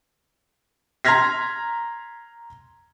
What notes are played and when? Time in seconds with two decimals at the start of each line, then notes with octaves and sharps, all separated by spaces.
1.05 A#5 C6 F6 G#6 A#6 B6